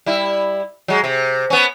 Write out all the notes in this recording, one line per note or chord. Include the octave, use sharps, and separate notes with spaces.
G3 E4
F#3 G#3
C3
B3 C#4